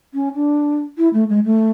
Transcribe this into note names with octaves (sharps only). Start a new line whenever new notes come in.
C#4
D4
E4
A3
G#3
A3